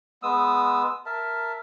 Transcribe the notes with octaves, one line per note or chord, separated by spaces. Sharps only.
G#3 B3 D#6 E6
A#4 E5 A5